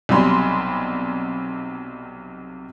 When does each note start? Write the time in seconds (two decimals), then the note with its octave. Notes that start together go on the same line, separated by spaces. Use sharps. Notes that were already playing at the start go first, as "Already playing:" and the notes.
0.09 B1 C3 F#3 G3 B5 C6